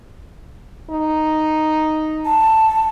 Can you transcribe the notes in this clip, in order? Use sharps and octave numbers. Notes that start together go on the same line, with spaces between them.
D#4
A5